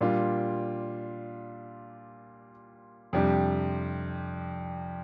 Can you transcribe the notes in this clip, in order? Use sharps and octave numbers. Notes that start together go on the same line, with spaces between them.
A#2 G3 D4 F4
F2 C3 G3 D4 G4